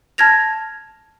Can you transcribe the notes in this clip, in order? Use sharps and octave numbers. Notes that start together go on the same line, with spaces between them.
A5 F6 G#6 A#6 F7